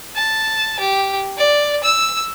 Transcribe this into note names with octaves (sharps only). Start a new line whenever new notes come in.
A5
G4
D5
E6